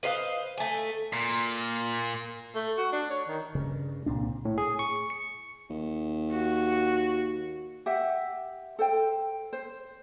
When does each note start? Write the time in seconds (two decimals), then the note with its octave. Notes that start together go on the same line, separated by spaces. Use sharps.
0.03 B4 C5 D#5 F5
0.58 A3 G#5
1.13 A#2
2.55 A3
2.78 F#4
2.92 D4
3.10 C#5
3.28 D#3
3.55 G2 C#3
4.06 C2 A#2 C4 D4
4.45 A2
4.58 G#4
4.79 C#6
5.10 C#7
5.70 D#2
6.32 F#4
7.86 G4 E5 F#5
8.79 A4 C5 G5
9.53 C5